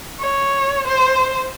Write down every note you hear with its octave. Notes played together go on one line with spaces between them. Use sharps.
C#5
C5